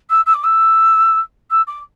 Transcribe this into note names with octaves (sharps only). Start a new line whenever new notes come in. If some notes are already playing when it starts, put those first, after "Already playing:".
E6
E6
D6
E6
E6
D6